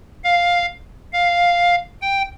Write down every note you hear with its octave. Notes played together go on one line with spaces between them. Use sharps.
F5
F5
G5